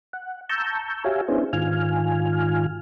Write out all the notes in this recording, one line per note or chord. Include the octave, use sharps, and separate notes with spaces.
F#5
A5 A#5 C#6 E6 G6
F#4 G4 C#5 E5 F5 G#5
B3 C#4 D4 E4 G#4 C5
G#2 D#3 F4 G#5 F6